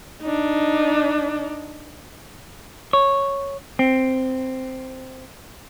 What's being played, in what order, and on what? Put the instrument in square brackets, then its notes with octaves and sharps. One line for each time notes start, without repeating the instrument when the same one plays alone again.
[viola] D4 D#4
[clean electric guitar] C#5
C4